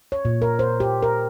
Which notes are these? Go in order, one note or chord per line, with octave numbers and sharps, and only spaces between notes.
C#5
A#2
A#4
C5
G4
A#4